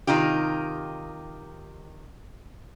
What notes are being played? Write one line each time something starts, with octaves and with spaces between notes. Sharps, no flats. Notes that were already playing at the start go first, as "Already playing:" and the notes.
C3 D#3 D#4 F4 G4